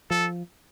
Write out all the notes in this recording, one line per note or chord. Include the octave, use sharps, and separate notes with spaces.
F3 A4